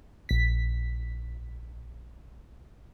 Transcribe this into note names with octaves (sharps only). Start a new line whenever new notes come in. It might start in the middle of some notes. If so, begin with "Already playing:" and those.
A#1 B6